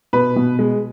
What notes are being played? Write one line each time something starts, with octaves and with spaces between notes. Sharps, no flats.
B2 B4
B2
G#3